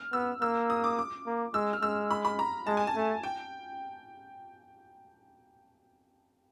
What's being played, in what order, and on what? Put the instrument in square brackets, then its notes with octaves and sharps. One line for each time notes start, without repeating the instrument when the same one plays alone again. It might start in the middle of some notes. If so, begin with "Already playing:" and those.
Already playing: [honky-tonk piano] F6
[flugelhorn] B3 [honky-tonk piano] E6
[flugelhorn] A#3 [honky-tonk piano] E6
[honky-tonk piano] D#6
D6
D6
[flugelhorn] A#3
[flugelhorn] G#3 [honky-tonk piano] E6
[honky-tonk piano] F6
[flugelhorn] G#3 [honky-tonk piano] E6
[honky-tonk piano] B5
B5
A#5
[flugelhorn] G#3 [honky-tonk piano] A5
[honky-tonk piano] G#5
A5
[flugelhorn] A3
[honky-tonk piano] G5